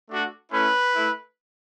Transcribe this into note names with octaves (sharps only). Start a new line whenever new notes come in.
A3 D4 F#4
A3 C#4 E4 B4
A3 E4